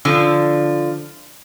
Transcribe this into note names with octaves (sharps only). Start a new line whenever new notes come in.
D3 F3